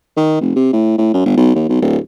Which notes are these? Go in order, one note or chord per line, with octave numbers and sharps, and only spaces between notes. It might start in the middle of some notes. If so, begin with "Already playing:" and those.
D#3
F1
C3
A2
A2
F#2
G1
B1
D#2
B1
D1